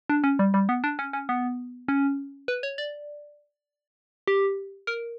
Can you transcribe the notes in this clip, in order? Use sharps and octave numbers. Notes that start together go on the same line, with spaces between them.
D4
C#4
G3
G3
B3
D4
C#4
C#4
B3
C#4
B4
C#5
D5
G4
A#4